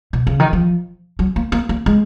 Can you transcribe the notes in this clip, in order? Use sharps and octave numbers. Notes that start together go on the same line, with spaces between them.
B2
C#3
D#3
F3
F#3
A#3
A#3
A#3
G#3